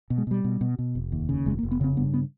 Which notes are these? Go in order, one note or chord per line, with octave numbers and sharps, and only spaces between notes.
B2
G#3
B2 G3
B2
B2
B2
F1
D#2
C#3
F1 G#3
A#3
F1
B3
C#3 C4
G2 B3
B3